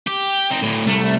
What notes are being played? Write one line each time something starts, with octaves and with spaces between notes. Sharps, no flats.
G4
C4 D#4
D2 A2
C2 A3